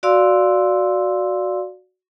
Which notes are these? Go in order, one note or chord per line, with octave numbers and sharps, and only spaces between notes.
F#4 D5 F5 C6 E6